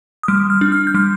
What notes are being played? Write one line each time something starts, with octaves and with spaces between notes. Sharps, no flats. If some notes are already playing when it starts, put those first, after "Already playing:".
D#6
G3 F6
F6
D4
F6
G6
G3 F6